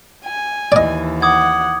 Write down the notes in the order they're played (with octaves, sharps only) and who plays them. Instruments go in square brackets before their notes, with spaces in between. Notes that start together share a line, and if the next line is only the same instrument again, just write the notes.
[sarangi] G#5
[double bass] D#2 E3 [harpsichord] D5 D#5
[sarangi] F#5 [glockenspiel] D6 D#6 G#6